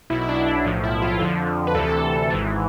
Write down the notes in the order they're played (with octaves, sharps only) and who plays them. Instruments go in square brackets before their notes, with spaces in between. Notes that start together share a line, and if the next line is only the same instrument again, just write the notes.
[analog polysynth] B1 B2 E4
E4
D4
B1 A2 F3
E4
F4
F2 D3 F3
B4
D2 C3 E3 A4
G#1 G#2 E3